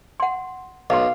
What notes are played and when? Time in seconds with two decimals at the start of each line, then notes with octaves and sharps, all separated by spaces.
0.20 F#5 C6
0.90 B1 D#5 F5 A#5 C6